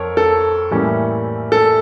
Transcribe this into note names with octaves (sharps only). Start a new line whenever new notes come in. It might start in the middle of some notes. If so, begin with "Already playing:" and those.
Already playing: F2 A#4 C#5
A4
A2 E3 G3 A#3 C#4
A4